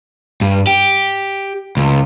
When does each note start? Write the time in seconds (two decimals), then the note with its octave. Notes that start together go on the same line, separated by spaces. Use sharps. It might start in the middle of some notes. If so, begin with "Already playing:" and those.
0.41 G2
0.67 G4
1.77 C#2